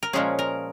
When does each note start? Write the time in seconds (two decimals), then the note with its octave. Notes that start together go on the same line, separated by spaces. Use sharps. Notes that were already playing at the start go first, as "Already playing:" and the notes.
0.03 A#4
0.13 A#2 F3 G#3 C#4 G#4
0.39 A#4